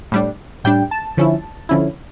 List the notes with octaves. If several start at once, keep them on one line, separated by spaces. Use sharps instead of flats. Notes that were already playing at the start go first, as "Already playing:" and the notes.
A2 G3 D4
A2 G3 D4 G5
A5
D3 F3 C#4 E4
D3 F3 C#4 E4